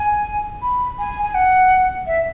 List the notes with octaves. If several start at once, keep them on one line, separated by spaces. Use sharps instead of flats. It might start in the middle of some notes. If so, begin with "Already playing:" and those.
Already playing: G#5
B5
G#5
G#5
F#5
E5